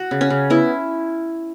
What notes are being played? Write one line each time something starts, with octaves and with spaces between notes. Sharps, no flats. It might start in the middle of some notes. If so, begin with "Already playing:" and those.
Already playing: F#4
C#3
C#4
C#3
B3 E4